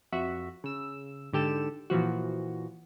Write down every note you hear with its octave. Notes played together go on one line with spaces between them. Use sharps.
F2 F#4 E5
C#3 E6
G#2 D3 G4 A4 E7
A#2 E3 F3 F#4